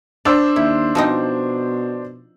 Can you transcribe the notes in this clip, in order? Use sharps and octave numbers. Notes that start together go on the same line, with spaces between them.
D4 C5 D5 E6
D#2 E4
B2 F3 C4 D#4